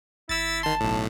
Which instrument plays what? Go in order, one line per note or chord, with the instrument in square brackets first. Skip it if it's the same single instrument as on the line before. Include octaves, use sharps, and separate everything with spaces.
[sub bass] G1 [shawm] E4 [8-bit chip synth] E6 A6
[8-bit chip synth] D#3 C6 [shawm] A5
[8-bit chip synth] B1 A2